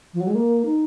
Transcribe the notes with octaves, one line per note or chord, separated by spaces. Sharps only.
F3
F#3
G#3
A#3
D#4